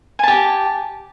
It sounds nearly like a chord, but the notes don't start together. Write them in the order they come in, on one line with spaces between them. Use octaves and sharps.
G#5 A5 G4